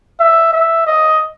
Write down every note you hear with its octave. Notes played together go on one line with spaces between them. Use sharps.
E5
E5
D#5